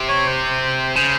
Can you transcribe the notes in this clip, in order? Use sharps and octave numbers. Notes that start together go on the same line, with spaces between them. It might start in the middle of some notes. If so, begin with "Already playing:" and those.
Already playing: C3
C#5
C5
C#3 C5